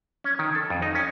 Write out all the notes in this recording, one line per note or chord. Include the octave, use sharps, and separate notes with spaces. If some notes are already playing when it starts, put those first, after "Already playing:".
C#4
D#3
A4
F2
D#4
C#4